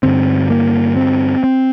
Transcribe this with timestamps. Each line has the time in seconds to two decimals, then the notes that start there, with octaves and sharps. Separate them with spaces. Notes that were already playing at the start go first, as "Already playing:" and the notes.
0.03 G2 D3 C4
0.50 A#3
0.96 C4
1.44 C4